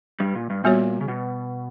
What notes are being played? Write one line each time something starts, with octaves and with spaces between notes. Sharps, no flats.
G2 G3
A#2
G2
A#2 G3 B3 F#4 C#5
C#3
B2